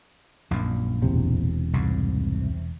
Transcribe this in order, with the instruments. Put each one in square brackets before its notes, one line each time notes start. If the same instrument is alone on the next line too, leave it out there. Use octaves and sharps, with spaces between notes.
[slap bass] A#1 F#2 A#2
[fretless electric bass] E1 C3
[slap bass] C2 G#2